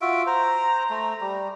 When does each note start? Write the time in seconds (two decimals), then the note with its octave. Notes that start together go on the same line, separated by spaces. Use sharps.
0.01 F4 F#4 E5 D7
0.26 C5 A#5
0.90 A3
1.21 G3